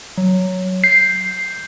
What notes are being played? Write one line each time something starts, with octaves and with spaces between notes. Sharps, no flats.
F#3
G6 C7